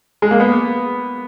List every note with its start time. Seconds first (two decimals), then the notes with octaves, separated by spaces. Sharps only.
0.22 G#3
0.31 A#3
0.40 B3